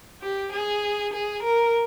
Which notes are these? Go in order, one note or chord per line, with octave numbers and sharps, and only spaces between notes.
G4
G#4
G#4
A#4